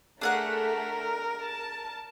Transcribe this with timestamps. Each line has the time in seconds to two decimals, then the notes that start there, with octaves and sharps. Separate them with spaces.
0.21 A3 D4 G#4 A#4 F#5
1.40 A5